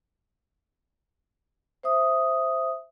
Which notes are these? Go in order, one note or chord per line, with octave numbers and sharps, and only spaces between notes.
C5 E5 D#6